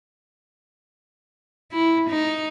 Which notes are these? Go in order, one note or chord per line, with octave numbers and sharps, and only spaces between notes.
E4
D#4